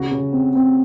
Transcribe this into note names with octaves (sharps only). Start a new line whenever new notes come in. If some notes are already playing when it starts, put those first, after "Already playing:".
Already playing: C#3 F#4
C#3
C4
C4